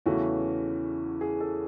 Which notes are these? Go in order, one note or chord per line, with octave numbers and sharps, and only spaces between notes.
E2 C#3 E3 A3 C#4 F#4
G#4
A4